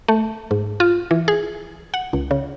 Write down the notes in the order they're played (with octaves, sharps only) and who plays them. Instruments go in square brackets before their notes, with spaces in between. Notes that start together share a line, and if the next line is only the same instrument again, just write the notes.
[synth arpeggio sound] A3
G#2
F4
E3
G#4
F#5
C#2
C#3